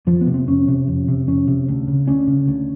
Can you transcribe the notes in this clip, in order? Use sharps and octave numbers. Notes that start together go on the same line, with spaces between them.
F2 F3
B3
C3
C4
F2 C#4
C3
F2
C3
F2 C#4
C3
D2
C#3
D2 C#4
C#3
D2